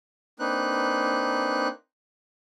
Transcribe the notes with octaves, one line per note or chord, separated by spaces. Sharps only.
A#3 C4 D4 D#4 B4 F#6